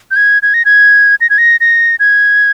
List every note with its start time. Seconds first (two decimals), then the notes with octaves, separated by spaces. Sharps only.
0.11 G6
0.16 G#6
0.43 G#6
0.54 A#6
0.65 G#6
1.21 A#6
1.30 G#6
1.38 A#6
1.60 A#6
2.00 G#6